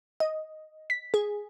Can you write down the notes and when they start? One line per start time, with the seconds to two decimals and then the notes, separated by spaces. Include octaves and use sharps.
0.20 D#5
0.90 B6
1.14 G#4